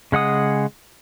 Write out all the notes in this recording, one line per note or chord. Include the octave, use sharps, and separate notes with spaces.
C#3 G#3 F#5 D#6